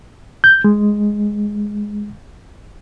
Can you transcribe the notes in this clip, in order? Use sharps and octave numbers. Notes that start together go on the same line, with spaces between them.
G6
G#3